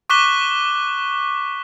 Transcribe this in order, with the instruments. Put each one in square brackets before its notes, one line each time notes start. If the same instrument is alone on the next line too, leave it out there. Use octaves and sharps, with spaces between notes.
[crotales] C#6 D6 F#6 B6 E7 G7